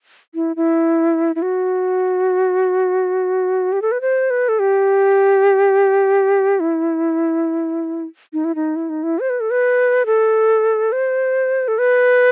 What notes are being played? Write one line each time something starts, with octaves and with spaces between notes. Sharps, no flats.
E4
E4
E4
F#4
G4
A4
B4
C5
B4
A4
G4
E4
D#4
E4
D#4
E4
D#4
E4
C5
B4
A4
B4
A4
C5
A4
B4